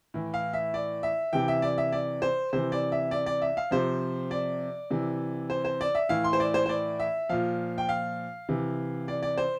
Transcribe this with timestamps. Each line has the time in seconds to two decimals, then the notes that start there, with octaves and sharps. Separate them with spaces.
0.14 A2 E3
0.34 F5
0.53 E5
0.74 D5
1.03 E5
1.33 C3 E3 G5
1.48 E5
1.62 D5
1.78 E5
1.92 D5
2.22 C5
2.53 C3 E3 C5
2.72 D5
2.92 E5
3.11 D5
3.26 D5
3.42 E5
3.57 F5
3.71 C3 F3 C5
4.31 D5
4.90 C3 E3
5.50 C5
5.65 C5
5.81 D5
5.95 E5
6.09 A2 E3 F5
6.24 C6
6.33 C5
6.40 D5
6.54 C5
6.66 C5
6.69 D5
7.00 E5
7.29 A#2 F3 F5
7.78 G5
7.89 F5
8.49 C3 E3
9.08 D5
9.23 D5
9.38 C5